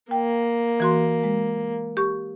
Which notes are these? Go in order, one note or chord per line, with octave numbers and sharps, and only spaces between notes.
A#3 G5
E3 F#4 C6
G#3
G4 C#6